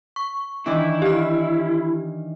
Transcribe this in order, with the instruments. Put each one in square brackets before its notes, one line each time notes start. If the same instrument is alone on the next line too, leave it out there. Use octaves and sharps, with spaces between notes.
[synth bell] C#6
[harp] D#3 E3 D4 [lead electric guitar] E4
[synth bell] G4 F6